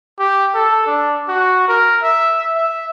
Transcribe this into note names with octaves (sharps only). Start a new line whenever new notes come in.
G4
A4
D4
F#4
A#4
E5
E5